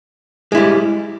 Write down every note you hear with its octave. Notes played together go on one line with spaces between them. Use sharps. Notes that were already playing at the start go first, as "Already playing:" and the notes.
G3 G#3 E4